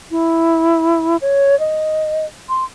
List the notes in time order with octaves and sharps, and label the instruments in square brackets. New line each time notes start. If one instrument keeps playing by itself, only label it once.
[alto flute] E4
C#5
D#5
C6